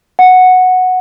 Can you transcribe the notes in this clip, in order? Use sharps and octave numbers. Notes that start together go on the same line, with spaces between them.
F#5